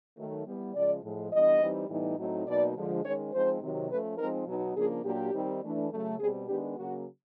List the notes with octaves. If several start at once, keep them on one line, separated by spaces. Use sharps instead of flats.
D#3 F#3 A3
E3 G3 B3
C#3 F3 G#3 D5
A2 F3 G#3
E3 G3 B3 D4 D#5
E3 G3 C4 D#4
A2 E3 G3 B3 D#4
A2 F#3 A3 C4 D#4
B2 F#3 A#3 D#4 D5
D3 F3 G#3
D#3 G#3 C#4 C#5
F3 G#3 C4 D#4 C5
C3 D#3 F#3
F3 A3 C#4 B4
F3 G#3 C4 D#4 A#4
B2 F#3 B3 D#4
C#3 F3 A#3 D4 G#4
A#2 F#3 A#3 D4 G4
D#3 G3 C4 D#4
E3 A3 D4
C#3 F#3 A3
B2 G3 C4 G#4
D#3 G#3 B3 D4 G4
C#3 F#3 A#3 F#4